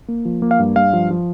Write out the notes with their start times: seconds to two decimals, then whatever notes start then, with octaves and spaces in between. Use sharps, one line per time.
0.08 A#3
0.25 F3
0.42 A#3
0.51 F5
0.59 G2
0.76 G2 F5
0.93 F3
1.11 F3